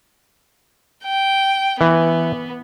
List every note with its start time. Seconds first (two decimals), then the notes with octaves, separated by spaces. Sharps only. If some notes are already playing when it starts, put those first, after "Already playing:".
1.04 G5
1.81 E3 B3